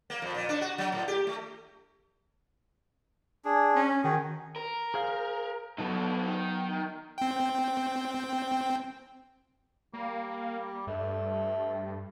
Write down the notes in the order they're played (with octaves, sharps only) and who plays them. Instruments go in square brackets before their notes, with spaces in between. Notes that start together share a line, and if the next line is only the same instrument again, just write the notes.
[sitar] A#3
F2
A#2
D4
F#4
F#3
A2
G4
A3
[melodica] D4 G#4
[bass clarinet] C#4
[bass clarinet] D#3 [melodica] F#4 G#4
[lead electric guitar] A#4
[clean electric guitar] G#4 C5 F5
[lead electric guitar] B2 A4 [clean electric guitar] F#3 B3 D#4
[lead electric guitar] D#3
[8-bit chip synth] C4 G5
[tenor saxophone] G3 [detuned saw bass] A#3
[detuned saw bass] G2 [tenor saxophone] A3